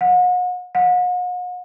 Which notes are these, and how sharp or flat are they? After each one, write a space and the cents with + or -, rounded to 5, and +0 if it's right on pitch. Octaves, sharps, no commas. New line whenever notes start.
F#5 -40
F#5 -45